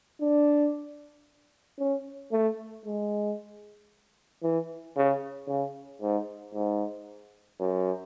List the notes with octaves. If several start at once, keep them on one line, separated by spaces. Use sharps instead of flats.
D4
C#4
A3
G#3
E3
C#3
C#3
G#2
G#2
F#2